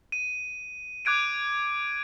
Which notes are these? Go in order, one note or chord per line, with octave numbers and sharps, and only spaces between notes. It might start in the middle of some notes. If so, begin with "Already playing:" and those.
D#7
D6 F#6 G#6 D7 D#7